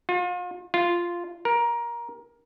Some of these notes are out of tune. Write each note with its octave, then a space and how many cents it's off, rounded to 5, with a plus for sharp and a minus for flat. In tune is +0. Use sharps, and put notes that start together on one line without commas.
F4 +40
F4 -5
A#4 +20